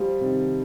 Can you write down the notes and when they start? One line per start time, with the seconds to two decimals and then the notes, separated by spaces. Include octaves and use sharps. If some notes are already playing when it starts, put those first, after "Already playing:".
Already playing: F3 G3
0.21 C3 D#3